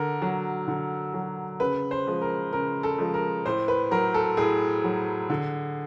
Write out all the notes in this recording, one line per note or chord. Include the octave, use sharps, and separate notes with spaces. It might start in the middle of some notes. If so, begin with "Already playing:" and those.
Already playing: D3 A#4
F#3
D3
F#3
C#3 B4
C5
F3 G#3
A#4
C#3 A#4
A4
F3 G#3
A#4
A2 C5
B4
F#3 A#4
A4
A2 G#4
F#3
D3